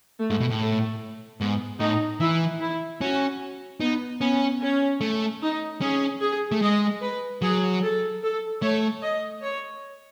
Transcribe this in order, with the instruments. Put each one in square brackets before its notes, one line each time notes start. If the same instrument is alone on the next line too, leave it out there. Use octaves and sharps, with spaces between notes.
[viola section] A3
[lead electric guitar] G#2
B2
A2
[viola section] A3
[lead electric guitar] G#2 [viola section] B3
[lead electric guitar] A2 [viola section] D#4
[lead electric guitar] E3 [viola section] E4
[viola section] E4
[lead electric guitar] C#4 [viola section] F#4
[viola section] B3 [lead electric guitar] D#4
[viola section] B3 [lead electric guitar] C#4
[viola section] C#4
[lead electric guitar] A3
[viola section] D#4
[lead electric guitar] C#4 [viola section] G#4
[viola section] G#4
[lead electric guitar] A3
[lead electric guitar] G#3 [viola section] D#5
[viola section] B4
[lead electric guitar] F#3 [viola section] G#4
[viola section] A4
A4
[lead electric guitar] A3 [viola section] C#5
[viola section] D#5
C#5